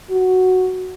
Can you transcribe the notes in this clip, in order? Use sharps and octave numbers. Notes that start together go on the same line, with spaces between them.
F#4